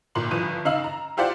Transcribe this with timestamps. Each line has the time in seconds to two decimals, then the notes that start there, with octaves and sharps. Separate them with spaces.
0.15 G1 A#2 C6 F#7
0.31 G1 G2 E3 F3 D#7
0.65 C#3 D#4 F5 E6 F#7
0.84 A#5
1.17 E4 F4 G4 C5 D5 F#5